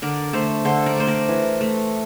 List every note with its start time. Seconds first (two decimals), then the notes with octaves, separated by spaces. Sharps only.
0.02 D3 A#4 D5
0.33 A3 A4 C5
0.65 D3 A4 C5
0.86 A#4 D5
0.96 A3 C5
1.07 A#4 D5
1.29 E3
1.61 A3